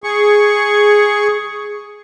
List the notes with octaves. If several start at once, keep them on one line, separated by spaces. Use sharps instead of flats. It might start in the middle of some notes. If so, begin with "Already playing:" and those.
G#4 C#6